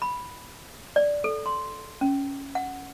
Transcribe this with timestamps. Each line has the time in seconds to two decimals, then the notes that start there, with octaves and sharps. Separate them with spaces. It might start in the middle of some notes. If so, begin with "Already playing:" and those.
0.02 B5
0.96 D5
1.24 A4
1.46 C6
2.01 C#4
2.55 F#5